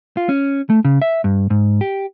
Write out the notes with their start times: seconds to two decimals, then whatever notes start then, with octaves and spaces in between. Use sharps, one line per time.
0.17 F4
0.29 C#4
0.70 A3
0.85 C#3
1.02 E5
1.24 G2
1.50 G#2
1.81 G4